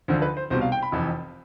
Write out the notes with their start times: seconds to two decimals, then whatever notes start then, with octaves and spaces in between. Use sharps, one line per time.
0.08 D2 D3 F3 C5
0.22 B4
0.37 C5
0.50 C2 B2 G3 C5
0.61 F5
0.72 G5
0.83 B5
0.92 F1 F2 E3